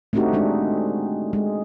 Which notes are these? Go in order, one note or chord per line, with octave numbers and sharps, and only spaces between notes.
A3 C4 D4 D#4 F#4 G4
G#3 D4 D#4
G#3